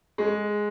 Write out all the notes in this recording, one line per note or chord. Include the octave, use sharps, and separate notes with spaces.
G#3